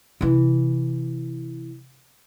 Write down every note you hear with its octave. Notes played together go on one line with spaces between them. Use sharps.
C3 E3